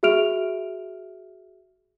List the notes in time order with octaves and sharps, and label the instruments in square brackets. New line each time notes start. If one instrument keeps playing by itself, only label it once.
[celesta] F#4 G#4 E5 F6 D7 F7